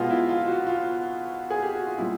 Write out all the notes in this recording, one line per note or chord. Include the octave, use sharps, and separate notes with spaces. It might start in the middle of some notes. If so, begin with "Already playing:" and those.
Already playing: B2 G#3 B3 F4
E4
F4
F#4
F4
G#4
G4
F#4
F4
A#2 G3 E4